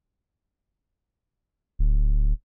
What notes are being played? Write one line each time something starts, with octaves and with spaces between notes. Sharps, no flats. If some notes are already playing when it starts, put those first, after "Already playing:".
D1